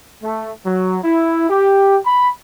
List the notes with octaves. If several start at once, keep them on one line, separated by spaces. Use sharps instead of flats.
A3
F#3
E4
G4
B5